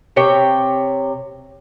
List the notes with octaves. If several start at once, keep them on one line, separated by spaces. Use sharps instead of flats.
C3 C#5 G5